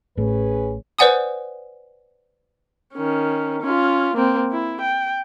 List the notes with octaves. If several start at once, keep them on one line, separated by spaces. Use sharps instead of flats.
A1 A2 C#4 G#4 B4
B4 C5 D5 F#5 G#5 D#6
D#3 C#4
C#4 F4
A#3 C4
E4
G5